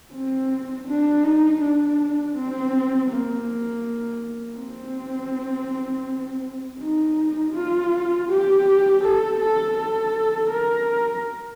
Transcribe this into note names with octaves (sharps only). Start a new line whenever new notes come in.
C4
D4
D#4
D4
C4
A#3
C4
D#4
F4
G4
A4
A4
A4
A#4